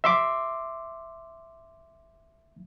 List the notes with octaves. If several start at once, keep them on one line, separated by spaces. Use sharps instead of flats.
E5 C6 D6